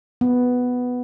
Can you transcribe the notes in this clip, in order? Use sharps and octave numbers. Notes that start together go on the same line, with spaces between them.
B3